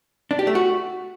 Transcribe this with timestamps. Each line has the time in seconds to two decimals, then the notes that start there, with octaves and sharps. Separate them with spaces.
0.31 D4
0.39 G4
0.47 A3
0.55 F#4